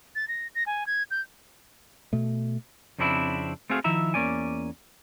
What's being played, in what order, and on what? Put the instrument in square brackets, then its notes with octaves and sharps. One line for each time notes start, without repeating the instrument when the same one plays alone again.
[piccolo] A6
A#6
A#6
G#5
G#6
G6
[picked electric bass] B2 A3
[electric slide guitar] F2 C#3 C4 D4 E4
A3 C4 F#4 G#4 F5
D#3 F3 E4 E5 A#5
E2 A#3 C#4 D5 G#5